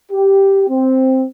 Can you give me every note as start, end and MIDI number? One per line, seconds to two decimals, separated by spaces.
0.12 0.64 67
0.70 1.24 60